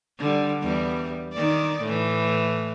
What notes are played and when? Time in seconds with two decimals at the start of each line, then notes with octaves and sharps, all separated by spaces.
0.19 D3 G3
0.61 E2 G3
1.33 D#3 D5
1.82 A2 E3